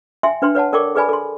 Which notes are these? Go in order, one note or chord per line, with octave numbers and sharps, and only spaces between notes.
E5 G5 G#5 C6
D4 B4 G5 C6
B4 C#5 F#5 A5
A4 A#4 D5 G5 C#6 D6
G#4 A4 B4 D5 G#5 B5
A4 C6